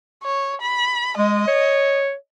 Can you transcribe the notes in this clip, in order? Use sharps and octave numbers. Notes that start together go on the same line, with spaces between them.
C#5
B5
G#3 D#5
C#5